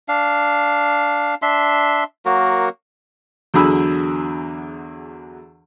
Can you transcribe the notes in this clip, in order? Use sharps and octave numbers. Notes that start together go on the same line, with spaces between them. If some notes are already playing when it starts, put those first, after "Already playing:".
D4 F5
D4 E5 C6
F#3 A#3 F#4 A#4
E2 D3 F#3 G#4 B5 E6